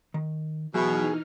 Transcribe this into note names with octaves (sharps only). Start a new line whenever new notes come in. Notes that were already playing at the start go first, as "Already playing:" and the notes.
D#3
B2 E3 F#3 D#4 G#4 E5 B5 F6